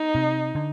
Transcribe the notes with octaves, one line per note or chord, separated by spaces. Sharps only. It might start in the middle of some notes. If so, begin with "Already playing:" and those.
Already playing: D#4
C3
D3